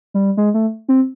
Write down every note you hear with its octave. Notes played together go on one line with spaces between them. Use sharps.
G3
G#3
A3
C4